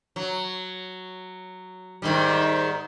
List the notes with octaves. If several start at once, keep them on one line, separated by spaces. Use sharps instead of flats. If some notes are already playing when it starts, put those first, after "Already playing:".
F#3
G#2 D#3 G3